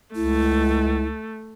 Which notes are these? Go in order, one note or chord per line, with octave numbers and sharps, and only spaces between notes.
C#2 A3 E4